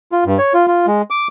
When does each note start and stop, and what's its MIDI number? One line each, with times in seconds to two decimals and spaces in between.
0.12 0.24 65
0.26 0.38 43
0.39 0.53 73
0.54 0.67 65
0.67 0.86 65
0.87 1.02 56
1.10 1.28 86